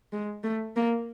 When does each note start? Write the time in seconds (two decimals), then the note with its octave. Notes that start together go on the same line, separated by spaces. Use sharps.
0.13 G#3
0.44 A3
0.76 A#3